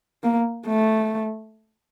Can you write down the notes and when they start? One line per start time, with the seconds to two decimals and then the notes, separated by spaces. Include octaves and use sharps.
0.23 A#3
0.67 A3